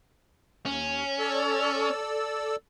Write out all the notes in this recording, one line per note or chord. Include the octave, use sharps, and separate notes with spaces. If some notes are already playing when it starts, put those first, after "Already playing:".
D#2 C#4
A4 D5 E6